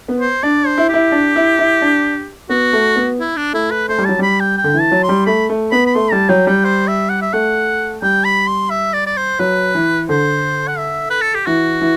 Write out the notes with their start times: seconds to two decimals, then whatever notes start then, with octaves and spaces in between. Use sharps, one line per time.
0.08 B3
0.20 C5
0.43 D4 D5
0.66 C5
0.78 E4
0.89 E4 G4
1.12 D4
1.36 E4
1.59 E4
1.82 D4
2.49 B3 F#4
2.73 A3
2.96 B3
3.20 E4
3.36 D4
3.53 A3 E4
3.71 B4
3.89 A3 C5
3.98 G3
4.05 F#3 A5
4.19 G3 B5
4.40 G5
4.57 G5
4.64 D3
4.74 E3
4.80 A5
4.91 F#3
5.03 C6
5.09 G3
5.26 A3 B5
5.49 A3
5.71 B3 B5
5.86 B5
5.95 A3 C6
6.12 G3 A5
6.29 F#3 G5
6.47 G3 G5
6.65 C5
6.88 E5
7.09 F#5
7.22 E5
7.33 A3 F#5
8.02 G3 G5
8.25 B5
8.47 C6
8.70 E5
8.93 D5
9.07 D5
9.17 C5
9.39 F#3 B4
9.75 E3
10.09 D3 C5
10.68 F#5
10.78 E5
11.10 B4
11.21 A4
11.34 G4
11.46 E3 F#4
11.81 E3